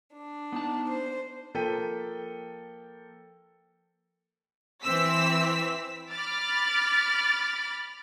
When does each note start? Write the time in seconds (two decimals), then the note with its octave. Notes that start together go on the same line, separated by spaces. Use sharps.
0.13 D4
0.52 B3 D#4 A5
0.89 C5
1.54 F3 A#3 A4 G5 B6 D#7
4.82 E3 C4 E6 B6
6.12 B5 D6 F6 A6